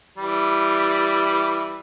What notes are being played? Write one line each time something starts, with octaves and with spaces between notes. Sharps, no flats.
E3 G3